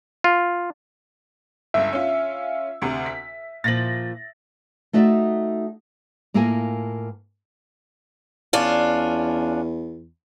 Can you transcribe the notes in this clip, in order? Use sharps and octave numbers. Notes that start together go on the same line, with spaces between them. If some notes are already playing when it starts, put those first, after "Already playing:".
F4
G1 C#2 E5
C#4 F4
D2 C3
B6
A#2 F3 A6 A#6 F#7
A3 D#4 F#4 D5 E5
A2 A#3 E4 F4 A#4 G#5
E2 C#4 D4 F4